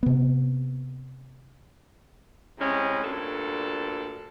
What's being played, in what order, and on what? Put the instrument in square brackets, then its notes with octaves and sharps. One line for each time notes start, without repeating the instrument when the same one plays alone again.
[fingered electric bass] C3 B3
[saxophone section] A2 C3 G#3 C#4
D2 G2 A#2 A4